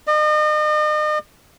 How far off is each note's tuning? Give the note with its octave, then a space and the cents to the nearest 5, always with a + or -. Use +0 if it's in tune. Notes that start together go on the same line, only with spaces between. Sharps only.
D#5 -40